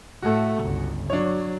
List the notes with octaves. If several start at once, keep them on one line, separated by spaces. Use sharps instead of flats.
A2 A3 F#4 A4
G1 C#2
F#3 D4 C#5